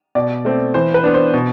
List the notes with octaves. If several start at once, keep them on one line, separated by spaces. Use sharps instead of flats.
B2 D5
A3 C4
E3 C5
B4
B3 D4
C5
B2